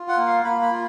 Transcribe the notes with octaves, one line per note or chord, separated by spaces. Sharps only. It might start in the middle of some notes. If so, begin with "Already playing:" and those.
Already playing: F4
F#5
A#3
F5
A#3 B5
B5
F4